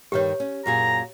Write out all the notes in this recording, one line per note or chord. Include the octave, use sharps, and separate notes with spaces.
G2 D#3 G3 G4 C#5
C#4
F#2 A#2 G#4 A#5